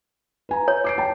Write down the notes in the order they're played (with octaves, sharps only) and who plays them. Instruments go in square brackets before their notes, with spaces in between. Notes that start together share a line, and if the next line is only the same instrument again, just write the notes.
[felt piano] B4 G#5 A#5
[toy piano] C#5
[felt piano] D6 C7 D7
G5 A5